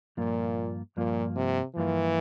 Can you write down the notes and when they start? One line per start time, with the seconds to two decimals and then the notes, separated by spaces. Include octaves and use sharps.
0.17 G2 A#2 F3 A#3 F4
0.97 G2 A#2 F3 A#3 F4
1.36 C3
1.76 G2 E3 F3 A#3 F4